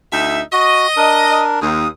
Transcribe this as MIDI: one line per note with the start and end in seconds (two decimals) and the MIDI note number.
0.13 0.42 38
0.13 0.42 63
0.13 0.42 76
0.53 0.87 66
0.53 1.44 75
0.97 1.60 62
0.97 1.60 70
1.62 1.86 39
1.62 1.88 87